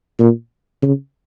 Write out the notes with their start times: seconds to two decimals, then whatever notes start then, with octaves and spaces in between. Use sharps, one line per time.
0.19 A#2
0.83 C#3